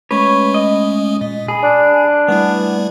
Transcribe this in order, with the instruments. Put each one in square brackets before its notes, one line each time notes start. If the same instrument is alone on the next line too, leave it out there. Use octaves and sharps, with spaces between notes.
[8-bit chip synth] G#3 A3 C#4 [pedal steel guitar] B4 C#5
[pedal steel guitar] D#5
[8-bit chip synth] A#2
[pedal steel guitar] G#4 [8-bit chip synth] B5
[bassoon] D4
[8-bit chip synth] G3 A3 E4 [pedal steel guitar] B3